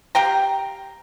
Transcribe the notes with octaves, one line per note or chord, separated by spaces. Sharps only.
G4 F5 G5 A#5